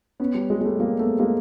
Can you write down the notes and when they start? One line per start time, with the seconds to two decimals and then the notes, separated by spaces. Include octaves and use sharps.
0.20 B3 C#4
0.35 G3
0.50 G#3
0.61 G#3
0.64 G3 A3
0.80 G#3 A#3
0.99 A3 B3
1.19 G#3 A#3